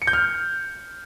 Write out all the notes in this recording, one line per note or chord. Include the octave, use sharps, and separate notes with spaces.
C#7
G6
F6